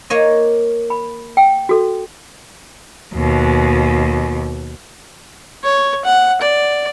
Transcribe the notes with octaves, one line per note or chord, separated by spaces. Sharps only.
A#3 C#5 D#5
B5
G5
F#4 A4
D#2 B2
C#5
F#5
D5